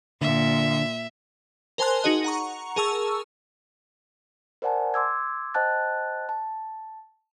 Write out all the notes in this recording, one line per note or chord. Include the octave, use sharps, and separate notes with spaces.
A#2 D3 E5
A#4 C5 G#5 A5 C6 F#6
D#4 F#4 G#4 D#5
F#5 A#5 C#6
G#4 A#4 A5 C#6 E6
A#4 C5 D5 F#5 G#5 A5
C6 D6 E6 G#6
C5 D#5 G5 A5 F#6 A6
A5